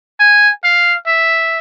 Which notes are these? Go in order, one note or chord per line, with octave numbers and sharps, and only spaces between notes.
G#5
F5
E5